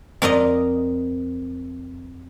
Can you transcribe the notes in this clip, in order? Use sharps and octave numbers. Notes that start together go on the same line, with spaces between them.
F2 A#4 D5 D#5